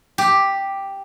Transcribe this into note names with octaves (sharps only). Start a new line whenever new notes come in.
G4